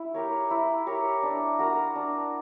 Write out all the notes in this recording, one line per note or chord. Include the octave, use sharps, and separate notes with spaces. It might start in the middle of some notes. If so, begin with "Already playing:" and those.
Already playing: E4
G4 A#4 C#5
E4
G4 A#4 C#5
D4
F#4 A#4
D4